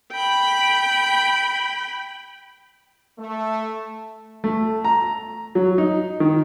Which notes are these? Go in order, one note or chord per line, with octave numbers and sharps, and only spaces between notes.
G5 B5
A3
A3
A#5
F#3
D#4
D#3